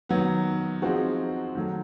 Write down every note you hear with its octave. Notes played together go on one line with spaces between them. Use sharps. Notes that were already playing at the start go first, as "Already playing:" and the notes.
D#3 F#3 B3
F3 G#3 C4 D#4 F#4
D#3 F#3 A3